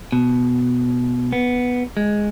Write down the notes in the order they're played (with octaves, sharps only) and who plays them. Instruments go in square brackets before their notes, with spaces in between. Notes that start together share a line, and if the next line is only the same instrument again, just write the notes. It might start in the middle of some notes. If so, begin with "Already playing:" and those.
[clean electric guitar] B2
B3
G#3